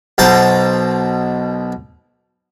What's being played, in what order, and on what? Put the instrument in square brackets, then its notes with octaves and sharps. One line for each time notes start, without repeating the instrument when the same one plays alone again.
[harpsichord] B1 B2 C5 A5 A#5